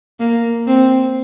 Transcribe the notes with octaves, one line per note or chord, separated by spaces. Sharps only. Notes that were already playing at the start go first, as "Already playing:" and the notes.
A#3
C4